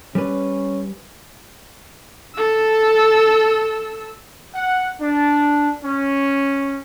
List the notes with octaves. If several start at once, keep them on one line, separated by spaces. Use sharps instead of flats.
G3 C#4 B4
A4 E6
F#5
D4
C#4